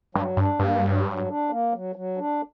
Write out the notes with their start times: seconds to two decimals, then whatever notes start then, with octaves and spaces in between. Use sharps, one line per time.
0.15 G2 F#3
0.37 G2 D4
0.59 G2 A#3
0.83 F#3
1.05 F#3
1.27 D4
1.50 A#3
1.73 F#3
1.96 F#3
2.18 D4